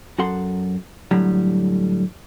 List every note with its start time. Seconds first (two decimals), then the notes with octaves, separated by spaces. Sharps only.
0.18 F#2 F#4 A4 F#5 C6
1.11 A2 D3 F#3 G3